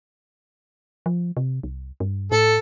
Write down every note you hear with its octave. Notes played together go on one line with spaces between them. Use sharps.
F3
C3
C2
G2
A2 A4